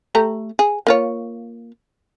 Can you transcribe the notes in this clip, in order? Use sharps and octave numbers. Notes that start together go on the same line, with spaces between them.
A3 G4 A#5
G#4
A#3 F4 C#5